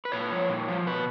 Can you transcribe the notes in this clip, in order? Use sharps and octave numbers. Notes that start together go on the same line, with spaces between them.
B4
A#2 C#5
F3
A#2
F3
B2 B4